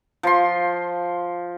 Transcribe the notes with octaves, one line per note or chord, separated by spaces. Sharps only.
F3 C6